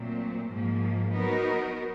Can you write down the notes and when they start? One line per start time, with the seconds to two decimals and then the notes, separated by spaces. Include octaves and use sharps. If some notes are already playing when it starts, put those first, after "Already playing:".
Already playing: A#2 F#3 A3 C4
0.50 G#2 F3 A#3
1.13 F#3 B3 D#4 F#4 A#4